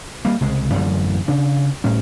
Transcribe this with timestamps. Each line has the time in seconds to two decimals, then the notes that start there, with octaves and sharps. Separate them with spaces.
0.25 G3 A#3
0.41 C2 C#3 G#3
0.73 A1 F#2 D3 G3
1.28 C#3 D4
1.84 A2 G3 C#4